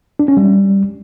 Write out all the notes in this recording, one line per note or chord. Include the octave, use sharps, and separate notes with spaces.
D4
C#4
G3